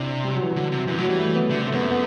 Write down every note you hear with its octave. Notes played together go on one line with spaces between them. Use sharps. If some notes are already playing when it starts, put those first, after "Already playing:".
Already playing: C3 D4 E4
G3
F#3
E3
F#3
D3
C3
F#2 E3
A2 F#3
E3 G3
A3
B3
D3 A3
C3
A3
F#2 B3
A3
B3